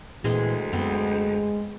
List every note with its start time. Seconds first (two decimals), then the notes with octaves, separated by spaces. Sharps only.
0.24 D2 A#2 E3 G#3 C4 G#4
0.73 F#2 G#3 B3 C4